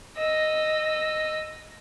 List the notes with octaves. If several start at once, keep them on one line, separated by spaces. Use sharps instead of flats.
D#5 E6